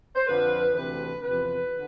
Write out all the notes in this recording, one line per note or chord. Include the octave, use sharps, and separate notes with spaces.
C5
F2 D3 F3 B4
D2 C3 E3 B4
E2 C3 F3 B4
D3